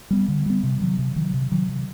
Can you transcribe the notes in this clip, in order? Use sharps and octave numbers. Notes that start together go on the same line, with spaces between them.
G3 B3
D3
G3 B3
C3
D#3 F#3
C3
D#3 F#3
C3
D#3 F#3
C3